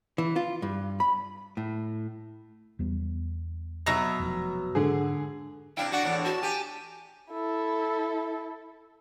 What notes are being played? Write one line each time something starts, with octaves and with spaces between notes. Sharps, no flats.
E3
F4
G2
B5
A2
E2 G3 B3
B2 F#3 E5 A#6
F1 F2
G#2 D3 G#4
C3 D4 E4 F5 G5
F#4 D5 F#5
E2 A2 D4
F#4 A5
G4 G#5
E4 A4